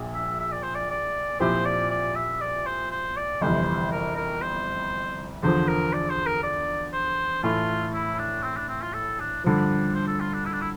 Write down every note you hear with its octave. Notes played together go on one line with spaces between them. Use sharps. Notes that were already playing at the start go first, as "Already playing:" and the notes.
Already playing: A#1 A#2
E5
E5
D5
C5
D5
D5
A#2 F3 C4 E4 G4 C5
D5
D5
E5
D5
C5
C5
D5
G1 F2 C3 E3 C5
A#4
A#4
C5
E2 D3 F3 C5
A#4
D5
C5
A#4
D5
C5
A2 E3 A3 F4
E4
D4
C4
D4
C4
F4
A4
D4
G2 D3 F3 D4
C5
A4
F4
D4
E4
D4
E4